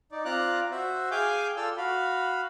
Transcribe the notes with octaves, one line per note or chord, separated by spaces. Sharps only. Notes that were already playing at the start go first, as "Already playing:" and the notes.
D#4 D5
C4 F4 D5 A#5 F#6
F#4 C5 E5
G#4 F5 G5 G#5 D6 G6
F4 A4 D5 G5 E6 F6
F#4 F5 B5